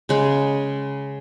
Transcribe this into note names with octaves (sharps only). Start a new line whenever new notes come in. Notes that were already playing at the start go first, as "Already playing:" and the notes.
C#3 G#3